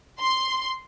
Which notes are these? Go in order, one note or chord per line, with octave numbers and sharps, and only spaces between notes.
C6